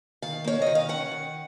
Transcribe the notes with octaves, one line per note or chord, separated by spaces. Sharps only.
D#3 F5
A#3 C#5
D#3 D#5
F5
C#4 F#5
D#3